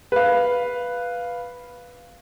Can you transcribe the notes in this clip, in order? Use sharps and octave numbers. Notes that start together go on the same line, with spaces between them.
B4 F5